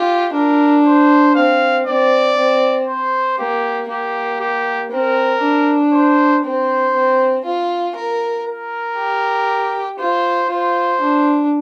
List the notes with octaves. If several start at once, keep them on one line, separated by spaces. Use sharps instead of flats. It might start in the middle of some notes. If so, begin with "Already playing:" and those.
Already playing: F4 G4
D4 A#4
C5
C4 F5
C4 D5
C4
C5
A#3 G4
A#3 G4
G4
C4 A#4
D4
C5
C4 C5
C4
F4
A#4
A#4
G4
F4 C5
F4 C5
D4